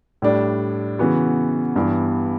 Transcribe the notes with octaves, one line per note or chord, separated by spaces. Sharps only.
A2 G3 D4
C#3 E3 B3 F#4
G2 E3 B3